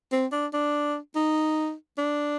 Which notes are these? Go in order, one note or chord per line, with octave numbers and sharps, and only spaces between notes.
C4
D4
D4
D#4
D4